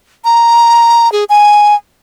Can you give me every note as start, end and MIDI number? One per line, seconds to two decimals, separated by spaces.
0.25 1.11 82
1.12 1.24 68
1.29 1.74 80